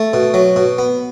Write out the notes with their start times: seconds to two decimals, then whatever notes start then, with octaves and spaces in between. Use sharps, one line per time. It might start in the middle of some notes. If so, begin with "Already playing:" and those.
Already playing: A3
0.13 B2
0.34 F#3
0.56 B2
0.78 B3